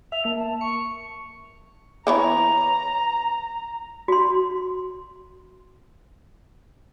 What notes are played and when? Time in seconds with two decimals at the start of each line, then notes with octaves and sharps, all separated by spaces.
0.12 E5 F7
0.25 A#3 A5
0.37 A5
0.61 C#6 C#7
2.07 E3 B3 C#5 A#5
4.08 F#4 C6